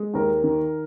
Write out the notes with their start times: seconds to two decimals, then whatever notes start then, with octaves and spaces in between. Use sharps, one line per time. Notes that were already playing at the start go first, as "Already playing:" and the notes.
Already playing: G#3
0.14 D#2 A#4
0.43 D#3